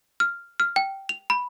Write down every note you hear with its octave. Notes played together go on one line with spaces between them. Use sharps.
F6
F6
G5
F7
B5